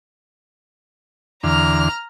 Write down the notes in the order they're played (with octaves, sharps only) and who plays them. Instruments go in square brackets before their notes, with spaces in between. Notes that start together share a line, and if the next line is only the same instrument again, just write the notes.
[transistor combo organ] E2 D3 [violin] A#5 F6